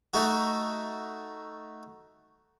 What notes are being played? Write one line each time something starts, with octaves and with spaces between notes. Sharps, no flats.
A3 D#4 F#4